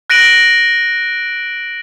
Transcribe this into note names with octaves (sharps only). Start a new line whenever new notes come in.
F#6 A#6 D7 D#7 F#7